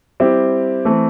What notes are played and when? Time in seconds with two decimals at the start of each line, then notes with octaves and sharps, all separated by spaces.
0.20 G3 C4 E4 G4
0.85 E3 A3 C4